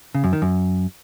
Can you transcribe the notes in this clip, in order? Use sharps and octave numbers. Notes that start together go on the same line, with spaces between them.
C#3
F#2
D#3
F#2